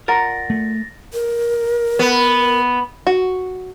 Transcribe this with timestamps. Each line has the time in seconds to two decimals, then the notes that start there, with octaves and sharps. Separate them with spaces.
0.08 F4 A#4 D5 F#5 A#5 A6 A#6
0.50 A3
1.13 A#4
1.99 B3
3.07 F#4